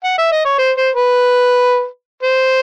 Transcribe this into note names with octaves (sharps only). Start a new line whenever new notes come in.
F#5
E5
D#5
C#5
C5
C5
B4
C5